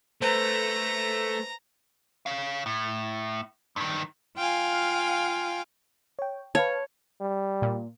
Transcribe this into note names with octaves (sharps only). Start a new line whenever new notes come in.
A3 B4 C5 A#5
C#5 F5
A2
G2 D#3
F4 F5 G5 G#5
C#5 G5
B4 C#5 F5 A5
G3
A#2